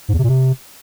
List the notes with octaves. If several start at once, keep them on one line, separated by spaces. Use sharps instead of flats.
G#2
E2
C3
A#2
C3